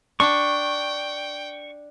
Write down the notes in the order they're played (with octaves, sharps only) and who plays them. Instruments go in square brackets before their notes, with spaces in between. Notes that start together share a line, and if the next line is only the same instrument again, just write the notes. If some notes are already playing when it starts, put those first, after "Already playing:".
[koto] D4 [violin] G5 [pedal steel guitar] C#6